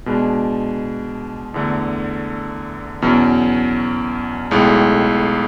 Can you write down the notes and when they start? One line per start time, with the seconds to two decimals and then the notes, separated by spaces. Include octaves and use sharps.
0.06 B2 G#3 D4
1.54 E2 D3 A3
3.02 E2 B2 F#3 C#4
4.51 B1 A2 G#3